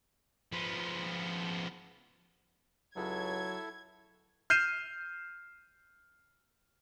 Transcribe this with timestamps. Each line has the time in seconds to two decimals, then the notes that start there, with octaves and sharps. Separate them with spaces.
0.52 F3 B3
2.96 C#2 F#3 E4 A4 G#6
4.50 F6 G6 C7 D#7 E7